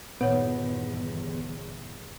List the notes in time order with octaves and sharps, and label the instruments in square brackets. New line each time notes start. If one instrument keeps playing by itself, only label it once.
[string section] G1 E2 [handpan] A#2 D#3 [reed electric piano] B3 [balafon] C#5 F#5